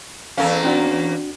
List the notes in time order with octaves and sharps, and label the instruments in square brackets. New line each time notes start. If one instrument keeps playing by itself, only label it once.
[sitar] E2 A#3 C#4 [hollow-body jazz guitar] A4 F5
[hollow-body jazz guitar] C4 D4 F#4